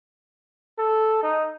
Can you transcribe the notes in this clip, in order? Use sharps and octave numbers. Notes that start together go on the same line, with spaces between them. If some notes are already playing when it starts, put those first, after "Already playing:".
A4
D#4